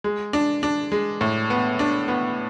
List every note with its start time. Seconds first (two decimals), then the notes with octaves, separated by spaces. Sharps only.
0.04 G#3
0.33 D4
0.63 D4
0.92 G#3
1.21 A2
1.50 B3
1.79 D4
2.08 B3